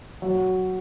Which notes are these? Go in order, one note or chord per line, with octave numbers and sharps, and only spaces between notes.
F#3